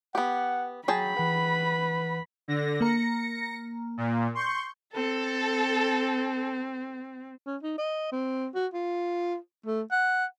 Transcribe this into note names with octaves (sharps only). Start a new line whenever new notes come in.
B3 G4 F#5
F#3 G#4 G5 A5 B5
E3 B4 F#5
D3 A#6
A#3 A#5 A#6 C#7
A#2
C6 C#6 G6
C4 A4
C#4
D#4
D#5
C4
F#4
F4
A3
F#5